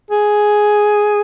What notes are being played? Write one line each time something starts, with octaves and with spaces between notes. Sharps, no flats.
G#4